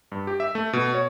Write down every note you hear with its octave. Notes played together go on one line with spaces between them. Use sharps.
G2
G4
E5
A3
B2
C#5